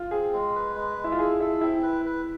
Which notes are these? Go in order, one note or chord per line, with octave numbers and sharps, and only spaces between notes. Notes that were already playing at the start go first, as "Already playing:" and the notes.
Already playing: F4
C4 G#4
G#3
B4
G#3
G#3
E4
F4
G#4 A4
E4 A4
C4 E4
B4
B4